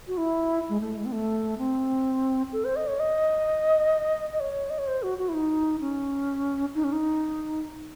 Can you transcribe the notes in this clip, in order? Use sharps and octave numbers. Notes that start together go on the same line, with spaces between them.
F#4
E4
G#3
A3
G#3
C4
A3
C4
A4
C5
D#5
C#5
D#5
D#5
C#5
D#5
C#5
C5
F#4
F#4
E4
D#4
C#4
D#4
C#4
D#4